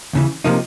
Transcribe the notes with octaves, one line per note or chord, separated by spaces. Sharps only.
D#2 C#3 E3
C3 F3 A#3 D#4